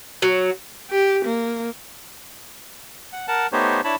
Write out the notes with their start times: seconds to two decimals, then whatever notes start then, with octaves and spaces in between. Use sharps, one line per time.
0.22 F#3
0.91 G4
1.25 A#3
3.13 F#5
3.28 A#4 F#5 A5
3.52 A3 B3 D#4 G4 C5 C#5
3.84 D4 E4 C#5 A5 B5